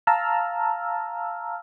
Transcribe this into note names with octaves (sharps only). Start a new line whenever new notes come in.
F5 A5 A#5 E6 F6